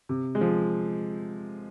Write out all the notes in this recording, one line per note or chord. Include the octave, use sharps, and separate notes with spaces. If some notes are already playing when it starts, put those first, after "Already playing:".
C3
G#3
F3